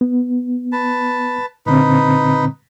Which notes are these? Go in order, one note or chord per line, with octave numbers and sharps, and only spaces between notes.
B3
B4 A5
A#2 D3 C4 D#4 B4